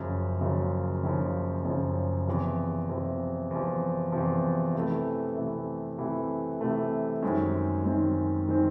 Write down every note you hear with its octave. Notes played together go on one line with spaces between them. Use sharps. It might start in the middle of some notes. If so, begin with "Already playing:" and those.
Already playing: F#1 F#2 C#3 F3
F#1 F#2 C#3 F3
F#1 F#2 C#3 F3
F#1 F#2 C#3 F3
E2 C3 F3
E2 C3 F3
E2 C3 F3
E2 C3 F3
C3 E3 A3
C3 E3 A3
C3 E3 A3
C3 E3 A3
F#2 D#3 G#3 C4
F#2 D#3 G#3 C4
D#3 G#3 C4